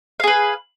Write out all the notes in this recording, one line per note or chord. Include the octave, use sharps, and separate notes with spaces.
G#4 B4 F5